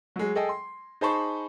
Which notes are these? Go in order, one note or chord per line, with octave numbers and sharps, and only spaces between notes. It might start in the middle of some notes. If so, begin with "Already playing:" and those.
F#3 G#3
G#4 A4 D#5 G5
C6
D#4 G#4 C5 A5 B5 C#6